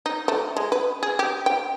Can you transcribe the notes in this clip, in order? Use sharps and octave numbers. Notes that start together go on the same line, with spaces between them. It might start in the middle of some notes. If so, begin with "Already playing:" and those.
D#4
A3
G#3
B4
G#4
G4
G5